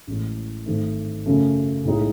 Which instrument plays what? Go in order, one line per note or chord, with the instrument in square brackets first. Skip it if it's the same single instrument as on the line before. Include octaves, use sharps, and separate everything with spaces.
[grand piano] A1 A2 G#3
G#1 G#2 D#3 A3
F#2 C#3 F#3 A3
B1 A2 G#3 D#4 G#4